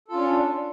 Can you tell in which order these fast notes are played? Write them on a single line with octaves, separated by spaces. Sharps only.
A4 F4 C#4 D4